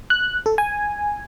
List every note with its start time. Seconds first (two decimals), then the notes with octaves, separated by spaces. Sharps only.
0.10 F#6
0.46 A4
0.58 G#5